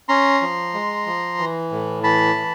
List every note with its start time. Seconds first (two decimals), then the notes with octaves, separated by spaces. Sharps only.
0.09 C#4 A#5 C6
0.41 F3
0.74 G#3
1.06 F3
1.39 E3
1.71 A2
2.03 E3 A5 B5
2.36 E3